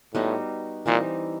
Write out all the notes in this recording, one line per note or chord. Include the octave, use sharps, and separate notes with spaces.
A2 G3 B3 D#4 F#4
A#2 E3 G3 C4 D#4